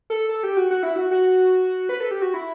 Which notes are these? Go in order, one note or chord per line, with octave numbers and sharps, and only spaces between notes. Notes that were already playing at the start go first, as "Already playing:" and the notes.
A4
A4
G4
F#4
F#4
E4
F#4
F#4
B4
A4
G4
F#4
E4